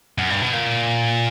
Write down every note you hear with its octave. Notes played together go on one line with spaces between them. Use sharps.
F#2
G2
B2
A#2